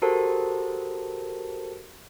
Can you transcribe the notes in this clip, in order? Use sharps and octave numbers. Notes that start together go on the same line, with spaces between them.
F#4 G4 A4 A#4 C5 A5